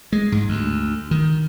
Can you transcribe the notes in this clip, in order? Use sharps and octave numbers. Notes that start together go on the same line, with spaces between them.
G#3
G#2
D2
D#3